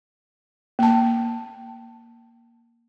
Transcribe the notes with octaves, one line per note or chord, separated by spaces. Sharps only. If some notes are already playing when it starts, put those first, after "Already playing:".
A#3 A5